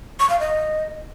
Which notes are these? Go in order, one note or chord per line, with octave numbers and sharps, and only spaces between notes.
C#6
F5
D#5